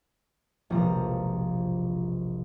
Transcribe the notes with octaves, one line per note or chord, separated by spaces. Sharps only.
E1 A#1 C3 F3 A#5